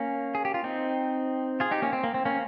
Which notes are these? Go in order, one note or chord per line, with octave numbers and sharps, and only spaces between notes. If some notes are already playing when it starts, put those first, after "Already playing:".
Already playing: A#3 C#4
G#4
G4
F4
C4 D#4
F4 G#4
D#4 G4
A#3 C#4
C4
A#3
C4
A#3 C#4